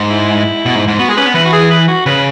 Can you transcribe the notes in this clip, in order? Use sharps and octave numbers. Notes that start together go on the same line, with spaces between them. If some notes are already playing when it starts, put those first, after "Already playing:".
Already playing: G#2
E4
B2
G#2
G#2
B3 F#4
G#3 G#4
C#4 B4
B3
E3 B4
F#4
G#4
B4
F#4
C#3 B4